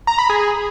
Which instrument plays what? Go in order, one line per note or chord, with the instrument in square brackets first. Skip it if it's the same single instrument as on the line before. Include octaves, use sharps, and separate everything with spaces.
[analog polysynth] A#5
B5
G#4